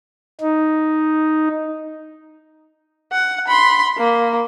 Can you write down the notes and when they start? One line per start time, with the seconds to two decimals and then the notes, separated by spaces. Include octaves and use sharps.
0.41 D#4
3.12 F#5
3.48 B5 C6
3.98 A#3